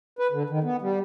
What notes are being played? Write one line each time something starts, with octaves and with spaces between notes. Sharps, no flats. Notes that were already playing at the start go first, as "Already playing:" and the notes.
B4
D3
D#3
B3
G3